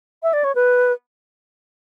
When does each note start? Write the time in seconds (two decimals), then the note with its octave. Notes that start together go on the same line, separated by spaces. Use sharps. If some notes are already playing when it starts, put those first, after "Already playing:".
0.23 E5
0.33 D5
0.44 C#5
0.55 B4